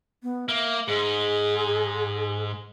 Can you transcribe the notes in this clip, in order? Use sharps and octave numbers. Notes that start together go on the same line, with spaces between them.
B3
A#3 E5
G#2 G#4